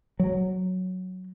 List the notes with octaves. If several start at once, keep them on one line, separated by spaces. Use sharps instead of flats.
F#3